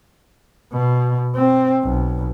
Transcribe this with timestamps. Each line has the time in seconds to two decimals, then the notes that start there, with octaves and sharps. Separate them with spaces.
0.73 B2
1.36 C4
1.83 B1